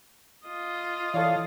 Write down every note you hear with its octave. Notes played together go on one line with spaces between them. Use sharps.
F4 D#5
E3 A4 C#5 D5 F5